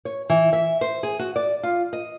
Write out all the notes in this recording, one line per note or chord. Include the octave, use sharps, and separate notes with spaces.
C#5
E3
E5
C5
G#4
F#4
D5
F4
D#5